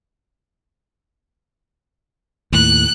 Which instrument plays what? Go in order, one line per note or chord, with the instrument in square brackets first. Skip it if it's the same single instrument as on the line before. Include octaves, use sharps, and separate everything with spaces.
[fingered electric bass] D#2 A2 [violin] F#6